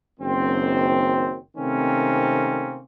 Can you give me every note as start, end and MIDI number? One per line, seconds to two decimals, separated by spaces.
0.20 1.38 30
0.20 1.38 42
0.20 1.38 51
0.20 1.38 60
1.57 2.80 48
1.57 2.80 51
1.57 2.80 57
1.57 2.80 58
1.57 2.80 60
1.57 2.80 61